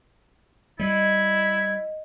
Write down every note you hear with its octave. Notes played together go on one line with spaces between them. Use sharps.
G3 E4 D#5 G#6